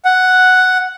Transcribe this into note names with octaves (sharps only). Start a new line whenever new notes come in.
F#5